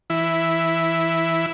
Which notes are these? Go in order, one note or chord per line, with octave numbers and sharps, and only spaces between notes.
E3 E4